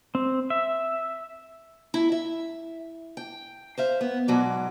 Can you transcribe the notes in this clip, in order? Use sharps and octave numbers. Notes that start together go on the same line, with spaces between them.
C4
E5
E4
E5
G5
C5 E5 F5
B3
G#2 B2 F#3 D5